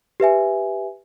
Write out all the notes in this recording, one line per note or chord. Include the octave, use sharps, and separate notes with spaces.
G4 B4 E5 G#5